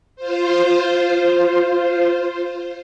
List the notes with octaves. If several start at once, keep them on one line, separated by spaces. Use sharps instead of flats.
F4 C5